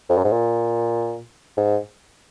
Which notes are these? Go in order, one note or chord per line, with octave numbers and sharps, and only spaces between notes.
F2
F#2
G#2
A#2
G#2